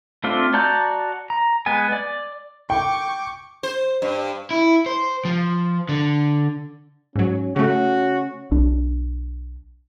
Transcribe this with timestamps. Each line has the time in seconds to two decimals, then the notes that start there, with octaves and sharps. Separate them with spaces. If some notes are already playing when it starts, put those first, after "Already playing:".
0.24 A3 C4 D4 F4
0.54 F#4 D5 A5 A#5 G6
1.30 A#5
1.66 G#3 B3 G#5
1.92 D5
2.70 G5 C#6 D6
3.63 C5
4.02 G2
4.51 E4
4.86 C5
5.25 F3
5.89 D3
7.16 G#2 F#3 C#4
7.56 C#3 A3 C#4 F#4
8.52 B1 D4